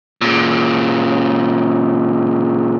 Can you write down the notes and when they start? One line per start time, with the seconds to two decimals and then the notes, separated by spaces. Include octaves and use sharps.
0.21 A#2 C#3